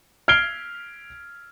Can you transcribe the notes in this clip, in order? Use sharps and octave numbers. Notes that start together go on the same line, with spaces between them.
F6 G#6 C7 D7 G7